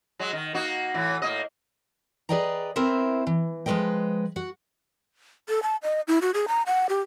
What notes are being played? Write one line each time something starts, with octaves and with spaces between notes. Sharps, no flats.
F#3 G#3
D#3
A#3 D#4 F#4
A2 E3
A2 A#3 D#5
G#4 B4 D5 D#5 G5 A#5
C4 E4 A#4 C5 E5
E3
F3 G#3 A3 B4 D#5 G5
F#4 F#5
A4
A5
D#5
E4
F#4
G#4
A#5
F#5
G4